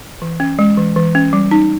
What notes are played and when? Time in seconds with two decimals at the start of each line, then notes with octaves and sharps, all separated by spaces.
0.22 E3
0.40 C#4
0.59 G#3
0.77 E3
0.96 E3
1.15 C#4
1.33 G3
1.51 D#4